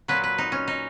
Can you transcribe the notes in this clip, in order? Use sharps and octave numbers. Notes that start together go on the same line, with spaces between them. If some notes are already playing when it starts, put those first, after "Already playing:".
A#2 F#3 B4
B4
D#4
C#4
D#4